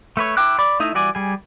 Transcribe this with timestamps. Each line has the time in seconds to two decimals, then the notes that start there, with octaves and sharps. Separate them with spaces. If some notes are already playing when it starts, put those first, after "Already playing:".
0.17 A3 B4 C#5
0.37 E4 G5 D6 F#6
0.59 D5 B5 D6
0.80 A3 D#4 E4 D#5
0.94 E3 G3 F#4 D5 G#5
1.15 G3 G#4 G#5